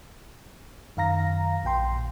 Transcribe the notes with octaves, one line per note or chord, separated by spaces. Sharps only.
F#2 D#3 F5 A#5 A#6
A#1 A#2 G5 C6